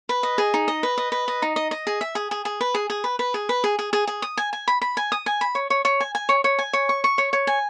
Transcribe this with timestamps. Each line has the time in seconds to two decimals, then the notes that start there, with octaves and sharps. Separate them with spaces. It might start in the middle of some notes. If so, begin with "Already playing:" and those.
0.09 B4
0.23 D#5
0.38 G#4
0.54 D#4
0.68 D#5
0.83 B4
0.98 D#5
1.12 B4
1.28 D#5
1.42 D#4
1.56 D#5
1.71 D#5
1.87 G#4
2.01 E5
2.15 G#4
2.31 G#4
2.45 G#4
2.61 B4
2.74 G#4
2.90 G#4
3.04 B4
3.19 B4
3.34 G#4
3.49 B4
3.64 G#4
3.79 G#4
3.93 G#4
4.07 G#4
4.22 D#6
4.37 G#5
4.53 G#5
4.68 B5
4.82 B5
4.97 G#5
5.12 D#6
5.26 G#5
5.41 B5
5.55 C#5
5.70 C#5
5.85 C#5
6.00 G#5
6.15 G#5
6.29 C#5
6.44 C#5
6.59 G#5
6.73 C#5
6.89 C#6
7.04 C#6
7.18 C#5
7.33 C#5
7.47 G#5